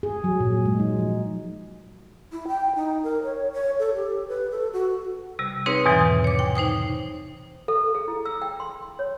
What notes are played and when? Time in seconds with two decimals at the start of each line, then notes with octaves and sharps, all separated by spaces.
0.03 G#4
0.24 F#3
0.40 A#2
0.66 G#3
0.80 D#4
0.99 F3
2.32 E4
2.48 G5
2.76 D#4
3.04 A#4
3.23 C#5
3.53 C#5
3.79 A4
3.95 G4
4.28 B4
4.51 A4
4.73 F#4
5.39 C3 G3
5.66 C4 D#4 G#4 B4 C#5
5.86 E2 G#2 B2 D#3 E3 F#3
6.24 C#5 D6
6.39 G5
6.55 D#4 C5 G5 D#6
7.68 A4
7.95 G#4
8.08 E4
8.25 E6
8.42 G5
8.60 C6
8.99 C#5